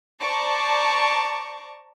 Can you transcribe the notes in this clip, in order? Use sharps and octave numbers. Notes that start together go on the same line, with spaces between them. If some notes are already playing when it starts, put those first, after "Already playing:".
C5 D5 A5 A#5 C#6 D6